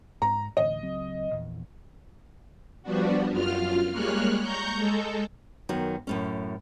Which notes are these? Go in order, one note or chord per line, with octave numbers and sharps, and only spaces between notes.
G#2 A#5
A1 D2 D#5
C#2 F#3 C4
A#1 E2
F3 G3 B3 D4 F#4
F#2 F4 F6
G3 G#3 A#3 C#5 F6 F#6
A#5 C#6 G6
G#3 A4
F#2 D#3 B3 F#4
F#2 A2 C#4